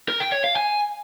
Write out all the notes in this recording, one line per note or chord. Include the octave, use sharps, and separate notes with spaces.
A#4
G5
C#5
F5
G#5